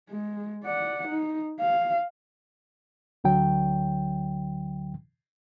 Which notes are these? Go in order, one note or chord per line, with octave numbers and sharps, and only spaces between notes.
G#3
D5 F#5
D#4
F5
D2 D3 F#3 G5